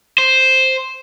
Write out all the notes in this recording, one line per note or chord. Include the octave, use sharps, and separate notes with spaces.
C5